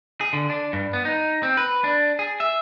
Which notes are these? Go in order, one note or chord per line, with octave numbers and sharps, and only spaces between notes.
G#4
D3
D4
G2
B3
D#4
C4
B4
D4
G#4
E5